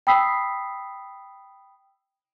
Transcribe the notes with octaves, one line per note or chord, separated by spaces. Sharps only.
G5 B5 D#6 E6 B6 C7